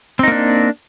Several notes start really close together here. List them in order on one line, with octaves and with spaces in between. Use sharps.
C4 D#4 A#3 D4